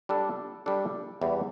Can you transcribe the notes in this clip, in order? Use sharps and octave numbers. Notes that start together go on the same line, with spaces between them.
G3 D4 A4
G3 D4 A4
E2 E3 G3